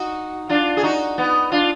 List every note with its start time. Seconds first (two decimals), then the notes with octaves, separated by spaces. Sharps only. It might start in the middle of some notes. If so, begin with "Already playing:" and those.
Already playing: D#4 F#4
0.49 D4 F4
0.77 G#4
0.83 D#4 F#4
1.18 B3 D#4
1.52 D4 F4